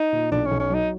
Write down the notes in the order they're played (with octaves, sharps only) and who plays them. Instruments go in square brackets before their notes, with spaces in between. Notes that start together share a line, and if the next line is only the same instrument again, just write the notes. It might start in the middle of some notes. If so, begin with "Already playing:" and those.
Already playing: [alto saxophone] D#4
[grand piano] A#2
[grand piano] B1 [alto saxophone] D4
[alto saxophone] C#4
[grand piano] B1
[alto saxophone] C#4
[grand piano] F#3 [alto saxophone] D#4